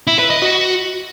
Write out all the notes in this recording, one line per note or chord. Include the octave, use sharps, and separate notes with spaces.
E4
B4
D#5
F#4